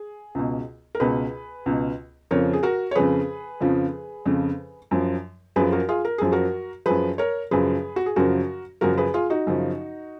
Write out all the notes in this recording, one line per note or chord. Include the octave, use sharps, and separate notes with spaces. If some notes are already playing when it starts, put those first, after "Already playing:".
Already playing: G#4
C#2 B2
A#4
C#2 B2 G#4 B4
C#2 B2
F2 C#3 F3 A#4 C#5
G#4
F#4 A#4
C#5
F2 C#3 F3 G#4 B4
F2 C#3 F3
F2 C#3 F3
F#2 F3
F#2 F3 G#4 B4
F#4 A#4
F4 G#4
A#4
F#2 F3 G#4
F#4 A#4
F#2 F3 G#4 B4
A#4 C#5
F#2 C#3 F3 G#4 B4
F#4
G#4
F#2 C#3 F3 F#4 A#4
F#2 C#3 F3 F#4 A#4
G#4 B4
F4 G#4
D#4 F#4
F#2 C#3 F3